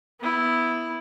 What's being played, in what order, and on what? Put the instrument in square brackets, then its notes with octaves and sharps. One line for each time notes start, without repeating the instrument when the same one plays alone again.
[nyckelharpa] B3 E4